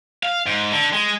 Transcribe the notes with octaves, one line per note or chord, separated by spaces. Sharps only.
F5
G#2
D3
G#3